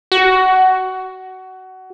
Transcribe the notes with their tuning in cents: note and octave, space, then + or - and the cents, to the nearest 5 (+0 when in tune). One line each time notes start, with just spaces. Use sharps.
F#4 +20